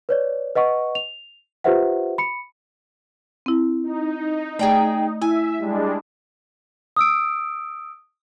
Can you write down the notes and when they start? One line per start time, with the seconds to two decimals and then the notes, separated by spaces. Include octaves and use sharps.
0.09 B4 C#5 D5
0.55 B4 D#5 F#5 C#6
0.95 F7
1.64 F4 G4 B4 C5 E5 F#5
2.18 B5 C#7
3.46 C4 E4
3.83 D#4
4.59 A3 G#4 D5 G5 A#5
5.22 E4 E5 G#5
5.59 G3 G#3 D4
6.96 D#6 E6 D7